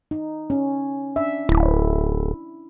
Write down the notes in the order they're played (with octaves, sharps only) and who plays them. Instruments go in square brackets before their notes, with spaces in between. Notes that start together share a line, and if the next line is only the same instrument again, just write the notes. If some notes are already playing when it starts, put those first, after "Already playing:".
[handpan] D#4
C#4
D4 E5
[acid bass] D1 [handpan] E4